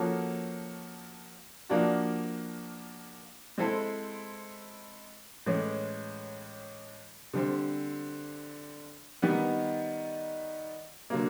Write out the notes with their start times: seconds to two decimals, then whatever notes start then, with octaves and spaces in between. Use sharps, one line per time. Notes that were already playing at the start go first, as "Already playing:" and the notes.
Already playing: F3 A#3 C#4 F#4 A4
1.69 F3 A#3 D4 F#4
3.58 G#3 C4 E4 A4
5.46 A2 E3 G#3 C#4
7.34 D3 G3 C4
9.22 D#3 G3 B3 D#4
11.10 D3 F#3 A#3